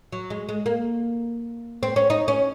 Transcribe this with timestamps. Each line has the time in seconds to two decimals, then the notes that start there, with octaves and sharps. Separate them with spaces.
0.12 F#3
0.30 G#3
0.49 G#3
0.66 A#3
1.83 C4
1.96 C#4
2.10 D#4
2.28 C#4